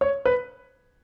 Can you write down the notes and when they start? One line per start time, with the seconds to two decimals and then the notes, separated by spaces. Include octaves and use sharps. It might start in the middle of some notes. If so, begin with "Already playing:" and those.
0.01 C#5
0.25 B4